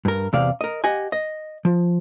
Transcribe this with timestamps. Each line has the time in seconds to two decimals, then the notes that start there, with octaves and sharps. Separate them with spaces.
0.05 G2 A#4
0.33 E2 C3 D5 F5
0.61 A#4 D#5
0.84 G4 D#5 F#5 G#5
1.12 D#5
1.65 F3